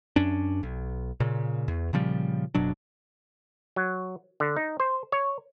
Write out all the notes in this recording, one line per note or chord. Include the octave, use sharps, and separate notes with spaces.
F#2 C#4 D4
B1
A#2 C#3
E2
A#2 C#3 F3 G3
F#1 B2 F#3 D4
F#3
D3
D#4
C5
C#5